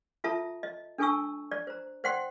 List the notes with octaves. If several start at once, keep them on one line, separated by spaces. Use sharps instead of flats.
F4 A4 E5 A5 A#5
D#5
D4 A4 G#5 A5 C#6 E6
D5
C5 A#5
C5 D5 F#5 G5 C6